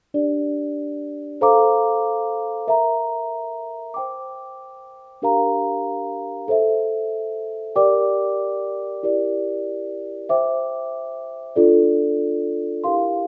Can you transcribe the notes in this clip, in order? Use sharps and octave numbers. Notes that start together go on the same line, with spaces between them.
D4 G4 D5
A4 C5 F5 A#5 D6
A#4 E5 A#5
C5 G5 D6
D4 G4 A#4 F5 A#5
A4 C5 E5
G4 A#4 D5 G5 D6
E4 G4 A#4 D5
C5 E5 G5 D6
D4 F4 A4 D5
E4 G4 A#4 F5 C6